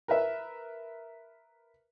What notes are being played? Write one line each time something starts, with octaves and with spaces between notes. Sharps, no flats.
A#4 B4 E5